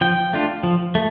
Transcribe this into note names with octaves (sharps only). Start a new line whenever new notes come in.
F3 G5
A3 D4 F4
F3
A3